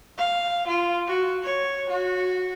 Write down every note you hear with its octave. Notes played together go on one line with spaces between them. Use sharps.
F5
F4
F#4
C#5
F#4